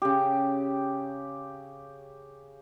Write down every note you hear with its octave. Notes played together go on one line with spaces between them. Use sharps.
C#3 G4